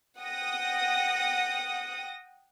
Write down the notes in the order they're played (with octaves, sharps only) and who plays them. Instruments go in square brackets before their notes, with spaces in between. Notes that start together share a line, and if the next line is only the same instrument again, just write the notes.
[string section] F#5 G5 D#6 A#6